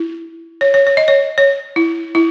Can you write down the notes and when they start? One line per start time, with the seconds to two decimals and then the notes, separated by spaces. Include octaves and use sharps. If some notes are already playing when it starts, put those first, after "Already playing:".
Already playing: E4
0.61 C#5
0.74 C#5
0.87 C#5
0.97 D#5
1.08 C#5
1.38 C#5
1.76 E4
2.15 E4